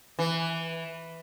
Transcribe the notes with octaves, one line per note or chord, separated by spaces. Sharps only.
E3